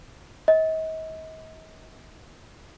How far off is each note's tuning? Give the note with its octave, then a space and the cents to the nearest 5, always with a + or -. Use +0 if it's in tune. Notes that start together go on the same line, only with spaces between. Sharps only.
D#5 +40